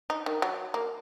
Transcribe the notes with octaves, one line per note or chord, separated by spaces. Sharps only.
D#4
D#3
F#3
A#3